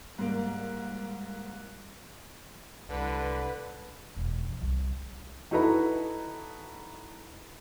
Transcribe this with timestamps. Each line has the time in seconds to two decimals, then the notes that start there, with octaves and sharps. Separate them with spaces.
0.18 G#2 G3 A#3 F#6
2.89 C2 D3 B4
4.16 E1
4.48 F3
4.62 C2
5.51 D#4 E4 F#4 A4 B4 A#5